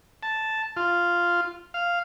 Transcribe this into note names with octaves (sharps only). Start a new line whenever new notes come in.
A5
F4
F5